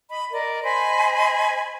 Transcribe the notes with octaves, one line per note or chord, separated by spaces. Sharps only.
D#5 B5
A#4 D5 D#5
C5 D#5 G#5 B5